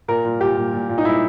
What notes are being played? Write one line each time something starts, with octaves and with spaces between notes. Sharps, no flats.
A#2 A#4
A#2
A#2 G4
A#2
A#2
A#2
D#4
A#2 E4